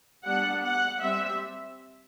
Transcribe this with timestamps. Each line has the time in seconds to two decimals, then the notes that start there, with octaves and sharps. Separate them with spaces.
0.24 G3 B3 D4 F#5
0.63 F#5
1.01 G3 C4 E5